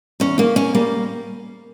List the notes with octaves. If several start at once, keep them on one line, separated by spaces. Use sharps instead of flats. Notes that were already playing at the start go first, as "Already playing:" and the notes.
E2 C#4
C#3 A#3
E2 C#4
G3 A#3